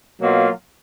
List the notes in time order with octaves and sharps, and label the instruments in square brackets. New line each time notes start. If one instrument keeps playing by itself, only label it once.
[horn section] B2 F#3 A#3 F4